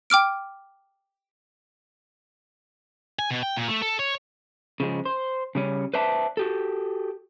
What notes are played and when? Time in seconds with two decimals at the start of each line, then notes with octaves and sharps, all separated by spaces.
0.10 G5 D6 F6 D7
3.19 G#5
3.31 B2
3.43 G5
3.57 A#2
3.68 A3
3.82 A4
3.99 C#5
4.80 C#3 F3 G#3
5.05 C5
5.55 C#3 G3 C#4
5.94 B4 C5 D5 E5 A5
6.37 F#4 G4 A4